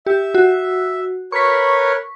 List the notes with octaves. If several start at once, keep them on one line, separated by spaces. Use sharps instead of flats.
G4 E5
F#4
A#4 B4 C#5 C#6 B6